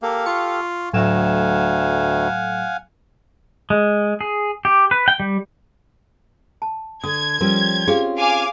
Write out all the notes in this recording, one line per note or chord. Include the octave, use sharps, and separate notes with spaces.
A#3 G4 A4 F5
F4 C#6
D2 A2 F#3 F5 F#5 G#5 E7
G#3
G#4
G4
B4
G5
G3
A5
D3 D#6 G#6
F3 G3 C#4 A#4
C4 C#4 F4 G4 G#4
F5 G#5 D6